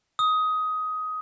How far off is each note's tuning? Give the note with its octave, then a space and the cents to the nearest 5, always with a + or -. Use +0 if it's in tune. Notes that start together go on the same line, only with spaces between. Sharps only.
D#6 +15